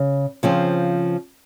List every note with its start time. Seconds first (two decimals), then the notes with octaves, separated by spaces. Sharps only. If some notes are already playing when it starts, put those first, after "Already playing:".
Already playing: C#3
0.43 C#3 F3 C4